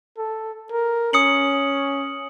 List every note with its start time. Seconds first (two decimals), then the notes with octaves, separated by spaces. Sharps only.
0.17 A4
0.72 A#4
1.13 C#4 D#6 C#7 F#7